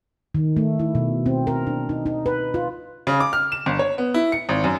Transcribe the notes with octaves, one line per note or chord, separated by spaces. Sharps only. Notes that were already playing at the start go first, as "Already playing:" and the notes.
D#3
A3
E4
B2
C4
A#4
D4
D#4
D#4
B4
F4
C#3
D6
F6
E7
G1
C#5
B3
E4
C#7
G#1
F#2